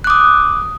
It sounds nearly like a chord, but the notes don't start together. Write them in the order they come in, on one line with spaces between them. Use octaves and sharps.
F#6 D6 D#6